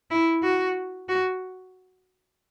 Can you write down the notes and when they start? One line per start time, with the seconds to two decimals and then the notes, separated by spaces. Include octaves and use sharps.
0.11 E4
0.43 F#4
1.09 F#4